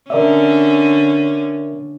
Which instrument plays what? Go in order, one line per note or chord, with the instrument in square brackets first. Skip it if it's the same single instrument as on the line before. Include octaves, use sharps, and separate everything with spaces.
[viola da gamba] D3 C#4 [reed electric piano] A#4 D5 E5